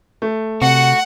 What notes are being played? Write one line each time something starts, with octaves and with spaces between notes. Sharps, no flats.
A3
C3 F#4 F#5